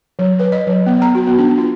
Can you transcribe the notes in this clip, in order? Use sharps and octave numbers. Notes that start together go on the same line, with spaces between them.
F#3
B4
D#5
F#3
B3
A#5
F#4
B3
D4
F4